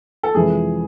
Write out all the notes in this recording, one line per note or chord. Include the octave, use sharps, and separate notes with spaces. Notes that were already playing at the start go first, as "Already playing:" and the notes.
A4
F2 C3 E3 G#3 G#4